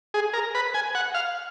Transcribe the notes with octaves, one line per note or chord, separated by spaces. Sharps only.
G#4
A#4
B4
G#5
F#5
F5